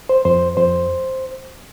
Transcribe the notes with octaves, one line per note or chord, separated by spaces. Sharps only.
C5
F2 C5
F2 C5